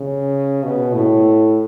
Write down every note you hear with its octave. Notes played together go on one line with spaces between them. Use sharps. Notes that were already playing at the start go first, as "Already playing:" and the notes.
Already playing: C#3
B2
A2